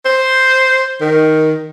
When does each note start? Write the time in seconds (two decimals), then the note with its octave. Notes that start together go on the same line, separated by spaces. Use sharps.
0.05 C5
1.01 D#3